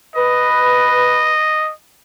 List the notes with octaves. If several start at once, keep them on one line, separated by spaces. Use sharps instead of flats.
B4 D#5